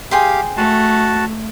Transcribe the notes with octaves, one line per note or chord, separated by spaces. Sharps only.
G4 G#4 F5 G5 C6
A3 F#4 A5